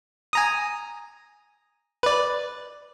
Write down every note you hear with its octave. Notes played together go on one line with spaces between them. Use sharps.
G#5 A#5 D#6
B4 D5